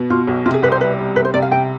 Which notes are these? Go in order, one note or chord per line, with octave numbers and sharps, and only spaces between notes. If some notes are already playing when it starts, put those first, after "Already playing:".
Already playing: B2 B3
B2 F4
B1
C3 F4
G#4
C2 B4
C5
G3 B4
G3
C3 B4
C5
C3 D5
F5
C3 G5